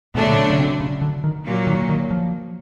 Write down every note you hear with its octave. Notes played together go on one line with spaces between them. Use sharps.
B2 D3 F#3 A3 D4
A#2
B2
C#3
C3
C#3
D3
D#3
A#2 F#3 A#3
D#3
D#3
F3